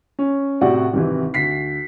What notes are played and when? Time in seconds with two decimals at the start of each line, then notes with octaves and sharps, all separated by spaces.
0.19 C#4
0.61 A2 C3 F#4 D5 F#5
0.94 G#1 C3 E3
1.34 D2 B6 C7